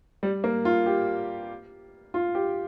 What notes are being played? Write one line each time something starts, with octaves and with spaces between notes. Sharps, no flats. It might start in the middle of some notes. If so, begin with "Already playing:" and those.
G3
A#3
F4
G4
F4
G4